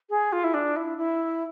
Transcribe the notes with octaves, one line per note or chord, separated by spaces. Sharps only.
G#4
F4
E4
D4
E4
E4